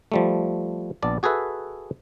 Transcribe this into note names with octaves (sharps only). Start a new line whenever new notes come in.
F3 G3 A3
A#1 B3 D5 A5
F#4 G#4 A4 B4 E5